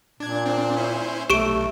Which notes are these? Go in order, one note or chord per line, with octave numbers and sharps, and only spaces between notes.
A#2 D4 G#6
C4 D4
C#4 E4 C5
B1 A3 G4 C#6 D7